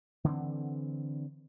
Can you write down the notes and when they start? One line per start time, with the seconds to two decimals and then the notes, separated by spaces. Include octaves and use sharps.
0.24 D3 E3 A#3 C4